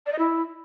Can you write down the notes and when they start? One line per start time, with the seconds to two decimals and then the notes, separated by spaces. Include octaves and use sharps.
0.06 D5
0.12 D#5
0.19 E4